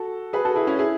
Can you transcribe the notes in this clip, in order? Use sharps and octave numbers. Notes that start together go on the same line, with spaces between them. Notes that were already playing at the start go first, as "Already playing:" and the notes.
Already playing: F#4 A4
G#4 B4
F#4 A4
E4 G#4
C#4 E4
E4 G#4